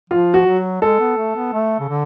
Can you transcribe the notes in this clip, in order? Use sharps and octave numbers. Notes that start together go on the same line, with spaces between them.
F3 F4
F#4
F#3
G#3 A4
B3
A3
B3
A3
C#3
D3